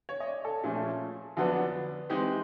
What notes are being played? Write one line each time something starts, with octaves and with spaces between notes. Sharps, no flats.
C#5
D#5
D5
A4
A#2 F3 A3 C#4 G#4
F2 D3 F#3 B3 D4
E3 G#3 C4 D#4 G4